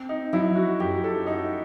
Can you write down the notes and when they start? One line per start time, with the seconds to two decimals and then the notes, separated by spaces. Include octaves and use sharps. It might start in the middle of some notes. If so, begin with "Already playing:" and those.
Already playing: C4
0.09 D#4
0.33 F#3 E4
0.55 F#4
0.80 F#2 G4
1.04 A4
1.26 D#4 F#4